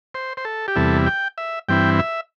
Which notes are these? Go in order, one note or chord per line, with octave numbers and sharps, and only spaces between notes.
C5
C5
A4
G4
E2 C3 G3 E4 A4
G5
E5
G2 E3 C4 E4 G5
E5